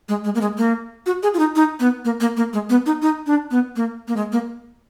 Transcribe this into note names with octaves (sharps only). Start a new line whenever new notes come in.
G#3
G#3
A#3
G#3
A#3
F#4
G#4
F4
D#4
D#4
B3
A#3
A#3
A#3
G#3
B3
D#4
D#4
D4
B3
A#3
A#3
G#3
A#3